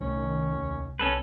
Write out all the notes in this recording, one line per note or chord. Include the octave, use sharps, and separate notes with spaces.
C2 A#2 D#3 A3 C#4
D#2
B1 C#4 A4 B4